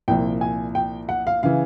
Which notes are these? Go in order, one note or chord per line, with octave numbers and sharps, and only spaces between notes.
C2 A#2 F3 G5
G#5
G5
F#5
F5
C#3 E3 F5